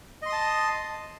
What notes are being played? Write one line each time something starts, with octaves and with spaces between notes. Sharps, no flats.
D#5 A5 C6 D#6